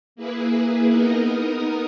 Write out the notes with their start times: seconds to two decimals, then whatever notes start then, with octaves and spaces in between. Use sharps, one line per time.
0.16 A#3 E4 G#4 B4
0.89 B3 D#4 A#4 D#5